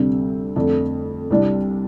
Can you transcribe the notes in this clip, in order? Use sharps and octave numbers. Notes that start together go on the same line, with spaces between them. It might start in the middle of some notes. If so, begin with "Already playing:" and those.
Already playing: D2 C3 G3 C4
F2 D3 A3 D4
C2 C3 G3 D4